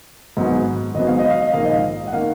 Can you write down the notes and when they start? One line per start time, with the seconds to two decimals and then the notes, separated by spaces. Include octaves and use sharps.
0.37 G#1 G#2 F#3 B3
0.95 G#1 G#2 F#3 B3 D#5
1.07 F5
1.19 D#5
1.30 F5
1.42 D#5
1.53 A#1 G#2 D#3 A#3 F5
1.65 D#5
2.07 F#5
2.13 D#3 A#3 F5